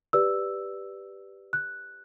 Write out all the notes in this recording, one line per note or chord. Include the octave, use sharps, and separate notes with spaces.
G4 B4 D5 E6
F#6